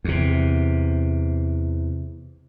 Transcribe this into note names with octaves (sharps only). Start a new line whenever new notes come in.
E2 C3